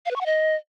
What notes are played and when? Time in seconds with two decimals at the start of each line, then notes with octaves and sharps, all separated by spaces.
0.06 F5
0.11 B4
0.16 C#6
0.21 F#5
0.26 D#5